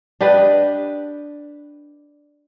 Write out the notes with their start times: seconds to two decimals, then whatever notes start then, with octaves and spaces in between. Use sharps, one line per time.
0.21 D4 G4 B4 D#5